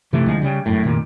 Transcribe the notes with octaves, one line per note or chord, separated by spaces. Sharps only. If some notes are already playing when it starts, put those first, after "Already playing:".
F#1 C3 E3 A3
D2 F3 G#3
C#3 G3
G1 F#2 A2
F1 A#2 D#3